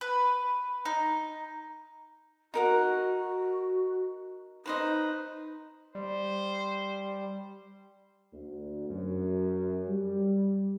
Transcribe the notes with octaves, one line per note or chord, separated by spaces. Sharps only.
B4
D#4
D#4 F#4 A#4 F#5
D#4 B4 C5 D#5
G3 C5
D2
F#2
G3